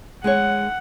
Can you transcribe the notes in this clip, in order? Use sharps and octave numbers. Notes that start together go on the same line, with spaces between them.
G#3 G#4 C#5 F#5